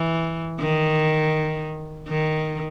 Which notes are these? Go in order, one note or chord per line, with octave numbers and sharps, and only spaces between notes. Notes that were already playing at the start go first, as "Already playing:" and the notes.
Already playing: E3
D#3
D#3